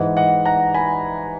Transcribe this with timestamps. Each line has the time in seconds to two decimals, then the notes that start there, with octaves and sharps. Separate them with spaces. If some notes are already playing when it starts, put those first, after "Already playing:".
Already playing: G#2 E3 D#5 F#5
0.17 D#5 F#5
0.45 F#5 A#5
0.74 G#5 B5